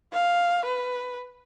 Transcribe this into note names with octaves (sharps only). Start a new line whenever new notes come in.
F5
B4